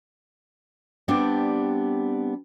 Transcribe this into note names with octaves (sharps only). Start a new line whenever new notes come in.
G3 B3 C4 D4 G4